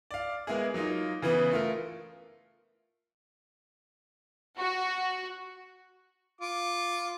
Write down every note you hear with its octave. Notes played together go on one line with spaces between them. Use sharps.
D5 F5
G#3 A#3 B3 E4 G#4
F#3 A#3 D#4 F4
C#3 E3 B3
A3 F4 A#4
F#4
F4 D6